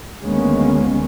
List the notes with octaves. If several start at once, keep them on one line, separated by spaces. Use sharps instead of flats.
D2 D#3 G#3 A#3 B3 C#4